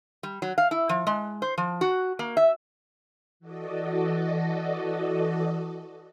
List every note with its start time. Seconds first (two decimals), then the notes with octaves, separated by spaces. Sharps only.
0.23 G3
0.42 F#3
0.58 F5
0.71 E4
0.89 F3
1.07 G#3
1.42 C5
1.58 F3
1.81 F#4
2.19 A#3
2.37 E5
3.40 E3 F#4 A4 D5 D#5